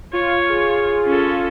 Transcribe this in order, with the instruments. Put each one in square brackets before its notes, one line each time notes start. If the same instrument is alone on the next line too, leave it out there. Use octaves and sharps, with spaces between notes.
[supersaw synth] F4 [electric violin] C#5
[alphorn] G#4
[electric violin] C#4 A4